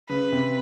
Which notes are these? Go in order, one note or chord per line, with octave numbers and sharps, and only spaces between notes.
C#3 B4
C3